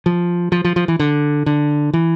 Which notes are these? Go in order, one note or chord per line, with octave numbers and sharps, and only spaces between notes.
F3
F3
F3
F3
E3
D3
D3
E3